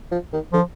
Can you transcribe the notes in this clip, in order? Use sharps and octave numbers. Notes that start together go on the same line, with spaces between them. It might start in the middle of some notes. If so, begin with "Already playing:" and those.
F3
D#3
D3 F3